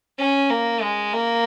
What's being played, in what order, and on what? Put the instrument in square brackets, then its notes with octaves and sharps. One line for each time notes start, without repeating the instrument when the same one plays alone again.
[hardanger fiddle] C#4
A#3
G#3
A#3